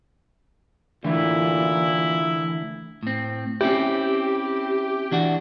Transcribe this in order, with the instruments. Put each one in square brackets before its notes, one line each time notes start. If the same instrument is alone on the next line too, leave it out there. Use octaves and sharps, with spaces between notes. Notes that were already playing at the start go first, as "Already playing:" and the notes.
[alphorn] A#2 [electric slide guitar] D3 E3 A3 [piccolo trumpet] E4
[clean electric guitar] A2 C4
[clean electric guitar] C4 C#4 E4 [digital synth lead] G4
[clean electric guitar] E3 D4 F#4